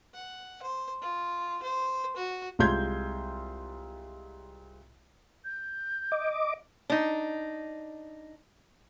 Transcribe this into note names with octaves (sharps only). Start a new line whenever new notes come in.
F#5
C5
F4
C5
F#4
C2 G#3 F4 C6 G6 G#6
G6
D#5 D6
D4 D#4